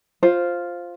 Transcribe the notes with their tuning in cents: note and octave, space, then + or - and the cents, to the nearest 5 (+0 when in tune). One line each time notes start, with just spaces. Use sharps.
F4 +0 C5 +5